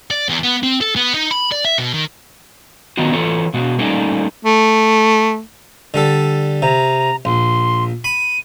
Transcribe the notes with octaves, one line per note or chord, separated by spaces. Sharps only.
D5
E2
B3
C4
A4
B3
D#4
B5
D5
E5
B2
D#3
D#3 B3 D#4 F4 F#4
E3 F4 A4 C#5
B2 G#3 F#4
G3 A3 A#3 C#4 D#4
A3
D3 G3 A4
C3 A#5
A#1 C6
B5 D#7